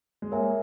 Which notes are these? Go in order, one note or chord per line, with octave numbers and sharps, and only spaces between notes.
G#3
A#3 A#4 C#5 E5 G#5